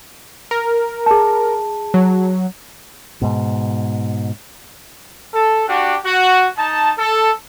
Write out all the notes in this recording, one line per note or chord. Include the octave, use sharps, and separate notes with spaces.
A#4
G#4 A5
F#3
G#2 B2
A4
D4 F#4 G4
F#4
D#4 A5
A4